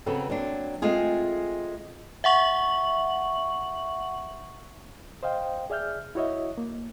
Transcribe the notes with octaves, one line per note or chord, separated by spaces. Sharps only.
C#3 F#3 B3 C4 A4
F#3 A#3 C4 D4
G#3 A3 C4 F4 G#4
E5 F#5 C#6 F#7
C5 D#5 F5 G5
G#4 D5 E5 F6 G6
E4 F#4 C#5 D#5 E5
A#3